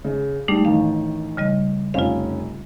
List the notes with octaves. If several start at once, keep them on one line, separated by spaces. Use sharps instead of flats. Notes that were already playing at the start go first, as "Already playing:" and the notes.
C#3
G3 A3 D4 D#4
A1 D#3 F5
C#3 G3 D#5
F1 C#4 F4 F5